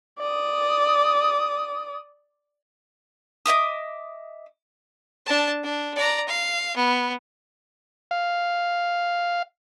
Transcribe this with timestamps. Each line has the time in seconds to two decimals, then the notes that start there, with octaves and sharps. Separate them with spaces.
0.19 D5 D#6
3.46 D#5 E5 D6 D#6
5.26 D4 A5
5.63 D4
5.96 D5 A#5
6.28 F5
6.76 B3
8.11 F5